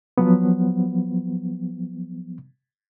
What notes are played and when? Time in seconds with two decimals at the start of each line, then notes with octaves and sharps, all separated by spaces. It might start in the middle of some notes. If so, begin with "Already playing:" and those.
0.18 F3 F#3 B3